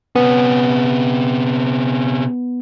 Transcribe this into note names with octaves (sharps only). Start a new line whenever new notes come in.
C3 B3 C#4